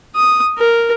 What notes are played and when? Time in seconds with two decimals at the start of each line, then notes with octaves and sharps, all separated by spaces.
0.15 D#6
0.58 A#4